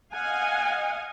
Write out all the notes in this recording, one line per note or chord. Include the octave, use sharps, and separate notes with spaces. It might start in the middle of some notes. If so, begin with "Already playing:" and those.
D#5 F5 F#5 G#5